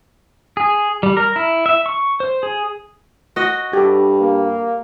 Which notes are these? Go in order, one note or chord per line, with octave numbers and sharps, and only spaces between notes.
G#4
G3
A#4
E4
E5
C#6
C5
G#4
F#4 D#5
G2 G4 A4
A#3